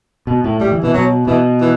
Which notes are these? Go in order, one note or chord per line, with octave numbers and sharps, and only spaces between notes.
B2
A2
A2 G3
E3
B2 E3
B2 F#3
B2 E3
E3